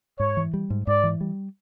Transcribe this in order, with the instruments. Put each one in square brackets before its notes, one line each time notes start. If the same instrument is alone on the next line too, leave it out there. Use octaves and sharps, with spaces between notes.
[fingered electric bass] G#2 [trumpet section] C#5
[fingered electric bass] E3
G3
G#2
[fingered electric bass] G#2 [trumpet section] D5
[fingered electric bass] E3
G3